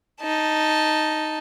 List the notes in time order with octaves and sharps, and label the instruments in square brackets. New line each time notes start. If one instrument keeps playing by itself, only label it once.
[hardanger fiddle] D#4 A5